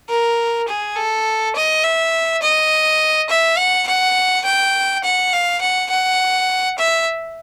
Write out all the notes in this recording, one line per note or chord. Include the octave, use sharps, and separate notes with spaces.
A#4
G#4
A4
D#5
E5
D#5
E5
F#5
F#5
G5
F#5
F5
F#5
F#5
E5